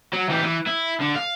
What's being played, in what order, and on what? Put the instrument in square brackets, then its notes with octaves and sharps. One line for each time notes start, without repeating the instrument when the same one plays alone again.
[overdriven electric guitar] F#3
E3 G4
E3
E4
D3
F5